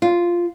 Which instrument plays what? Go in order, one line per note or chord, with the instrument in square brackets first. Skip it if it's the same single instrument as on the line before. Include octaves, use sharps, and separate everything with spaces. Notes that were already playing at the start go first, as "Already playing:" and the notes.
[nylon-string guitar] F4